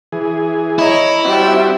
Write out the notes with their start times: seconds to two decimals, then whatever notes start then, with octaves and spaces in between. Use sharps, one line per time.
0.12 E3 G#4
0.79 E4 C#5 D#5 A#5
1.25 G3 C4 F#4 E5 G5